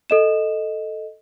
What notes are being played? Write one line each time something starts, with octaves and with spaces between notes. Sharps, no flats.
A4 D#5 E7